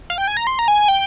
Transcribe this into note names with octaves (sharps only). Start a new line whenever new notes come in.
F5
G5
G#5
A#5
C6
A#5
G#5
G5